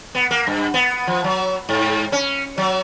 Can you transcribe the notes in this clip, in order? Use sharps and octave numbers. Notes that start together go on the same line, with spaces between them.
B3
A#3
G2
B3
F3
F#3
G#2
C#4
F#3